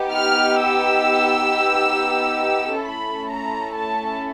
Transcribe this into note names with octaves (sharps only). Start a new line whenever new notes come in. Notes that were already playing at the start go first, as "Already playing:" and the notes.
Already playing: B3 D#4 G4
F6
E6
A3 C#4 E4 A4 B5
A#5
A5